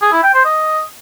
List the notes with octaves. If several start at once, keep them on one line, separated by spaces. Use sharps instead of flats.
G#4
E4
G5
C5
D#5